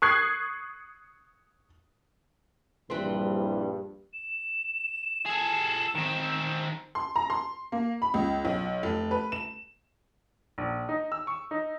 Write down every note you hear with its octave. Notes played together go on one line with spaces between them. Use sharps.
C#6 D#6 F#6 G#6 C7
A#1 G2 E3 G3 C4
E7
G#4 A4
D#3 C4
C6
A#5
C6
A#3
B5
C#2
B1
F1
B4
E7
A#1
D#4
E6
C#6
D#4